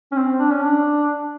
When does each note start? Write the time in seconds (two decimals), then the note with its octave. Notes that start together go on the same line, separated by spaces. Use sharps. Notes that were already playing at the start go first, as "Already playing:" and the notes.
0.12 C#4
0.16 C4
0.39 D4
0.51 C#4
0.63 D4